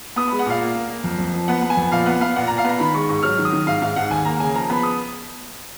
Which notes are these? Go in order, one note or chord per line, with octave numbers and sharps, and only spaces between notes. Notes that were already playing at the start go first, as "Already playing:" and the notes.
B3 D#6
G#3 B5
F#5
A#2 F5
A#3
A#3
A#3
F2
F2
F3
B3 F#5
B3
G#5
F2
A#2 F5
B3 F#5
B3 F5
A#2 F#5
A#2 A#5
F5
B3 A#5
D#3 B5
G#3 C#6
G#2 C#6
F#3 F6
D#3
D#6
D#3
G#2 F5
G#2 F5
G#2 F#5
D#2 G#5
A#3 A#5
C#3 G#5
F3 A#5
B3 B5
D#6